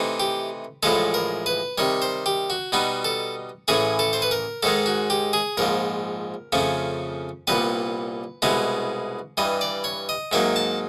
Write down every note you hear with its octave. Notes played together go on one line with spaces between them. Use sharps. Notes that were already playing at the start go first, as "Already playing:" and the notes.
Already playing: C3 E3 A3 C4 D#4
G4
A1 A2 F3 G#3 A4
A#4
B4
C3 D#3 G3 C#5
C5
G4
F#4
B2 G3 B3 D#4 F#4
A4
A1 A2 E3 A3 C#4 G#4
A4
C5
B4
A#4
G#2 D#3 G#3 A4
F#4
G4
G#4
A#1 G#2 F3 A#4
F2 C#3 F3 A3 C#4
C2 A#2 G3 B3 B4
C2 B2 G#3 B3 E4
G2 E3 G3 D#5
D5
C#5
D#5
G#2 D#3 F#3 A#3 E5
A5